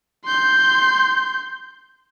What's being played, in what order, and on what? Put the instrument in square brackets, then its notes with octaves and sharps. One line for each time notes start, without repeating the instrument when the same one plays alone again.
[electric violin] C6 G6